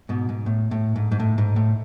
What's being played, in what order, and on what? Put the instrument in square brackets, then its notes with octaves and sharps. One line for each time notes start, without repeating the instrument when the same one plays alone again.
[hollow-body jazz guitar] G#2 B2
G#2
A2
A2
G#2
G#2
A2
G#2
A2